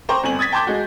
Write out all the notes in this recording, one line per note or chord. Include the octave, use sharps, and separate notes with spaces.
C5 G5 A#5 C#6 D6
G1 C4 G#5 F#7
D#6 G#6 A6 B6
G5 A5 C6 D6 G6
G#3 F#4